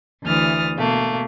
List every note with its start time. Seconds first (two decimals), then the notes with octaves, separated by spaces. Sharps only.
0.23 D2 E3 D#6 F6 A6
0.76 B2 A3 A#3